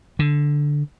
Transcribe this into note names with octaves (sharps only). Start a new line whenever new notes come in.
D3